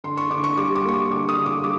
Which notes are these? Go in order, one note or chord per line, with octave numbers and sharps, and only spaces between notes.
D3 C6
C#6
D3 D6
C#6
G3 D6
D6
A#3 C#6
D6
D3 D6
D#6
D3
D6
G3 D6